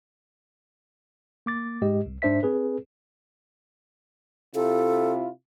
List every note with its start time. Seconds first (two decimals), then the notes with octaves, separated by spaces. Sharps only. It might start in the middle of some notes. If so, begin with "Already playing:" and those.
1.46 A#3 D6 A6
1.82 G#2 G#3 G4 D#5
2.06 C2
2.22 G#2 D4 C5 E5 B6
2.43 C4 G#4 B4
4.55 C3 E4 F4 A4